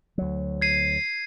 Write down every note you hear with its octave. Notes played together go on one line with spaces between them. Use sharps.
D2 F#3
G#6 C7 D#7